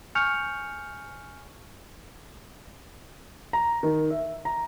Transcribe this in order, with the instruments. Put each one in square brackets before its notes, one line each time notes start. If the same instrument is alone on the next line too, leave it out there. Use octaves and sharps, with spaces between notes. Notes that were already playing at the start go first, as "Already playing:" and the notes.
[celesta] G#5 C#6 F6 G6 C#7 F7
[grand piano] A#5
D#3
E5
A#5